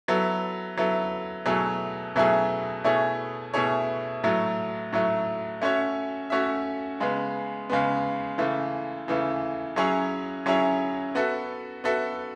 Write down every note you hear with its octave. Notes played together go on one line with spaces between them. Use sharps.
F#3 B3 E4 A4
F#3 B3 E4 A4
B2 F#3 A3 E4 G#4
B2 F#3 A3 E4 G#4
B2 A3 E4 G#4 C#5
B2 A3 E4 G#4 C#5
A2 F#3 A3
A2 F#3 A3
A3 C#4 F#4 C#5 E5
A3 C#4 F#4 C#5 E5
C#3 G#3 B3
C#3 G#3 B3
C#3 E3 A3
C#3 E3 A3
F#3 C#4 E4 G#4 C#5
F#3 C#4 E4 G#4 C#5
B3 F#4 A4 E5
B3 F#4 A4 E5